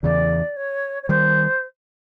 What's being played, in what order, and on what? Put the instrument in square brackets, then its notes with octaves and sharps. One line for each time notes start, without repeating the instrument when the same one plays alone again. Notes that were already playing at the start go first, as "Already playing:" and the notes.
[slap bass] E2 C#3 E3 [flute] D5
[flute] C#5
C#5
[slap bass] D#3 G3 [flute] C5